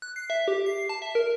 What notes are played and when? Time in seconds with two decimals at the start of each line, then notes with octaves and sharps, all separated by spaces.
0.02 F#6
0.16 C7
0.30 E5
0.48 G4
0.66 C7
0.89 A5
1.02 E5
1.15 A#4